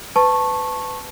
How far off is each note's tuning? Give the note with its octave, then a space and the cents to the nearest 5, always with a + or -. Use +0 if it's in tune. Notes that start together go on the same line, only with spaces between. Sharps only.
B4 +25 A5 +0 C#6 -15